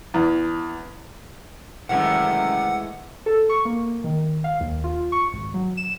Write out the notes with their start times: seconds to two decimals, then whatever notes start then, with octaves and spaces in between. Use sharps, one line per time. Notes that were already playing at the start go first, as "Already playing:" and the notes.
0.14 E2
1.89 F#2 C3 D#3 E3 G#3 A3 F#5
3.26 A4
3.49 C#6
3.65 A#3
4.04 D#3
4.44 F5
4.60 D#2
4.84 F4
5.12 C#6
5.33 G#1
5.54 F#3
5.77 E7